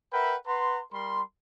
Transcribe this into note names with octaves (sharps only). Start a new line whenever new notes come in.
A#4 B4 E5 F#5 G5 B5
B4 F#5 A#5 C6
G3 A#4 B5 C6